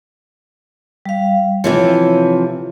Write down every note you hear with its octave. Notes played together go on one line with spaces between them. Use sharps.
G3 F5
C3 E3 F3 C#5